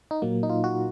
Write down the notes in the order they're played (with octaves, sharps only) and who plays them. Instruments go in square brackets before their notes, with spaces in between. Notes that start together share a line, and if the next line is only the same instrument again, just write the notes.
[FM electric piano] D#4
A#2 F#3 A#3
D#4
F4
F#4